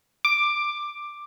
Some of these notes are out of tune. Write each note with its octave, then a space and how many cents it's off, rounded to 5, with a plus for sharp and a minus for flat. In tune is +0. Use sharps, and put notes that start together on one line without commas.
D6 +10